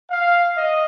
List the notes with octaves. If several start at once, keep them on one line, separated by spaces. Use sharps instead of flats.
F5
D#5